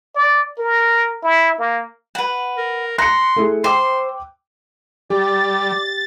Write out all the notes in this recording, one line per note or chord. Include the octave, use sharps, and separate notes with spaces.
D5
A#4
E4
A#3
B4 F#5
A#4
A#5 C6 F#6 C#7
A3 E4 G#4
C5 G5 C6 D6 E6
G3 G4 D5 A6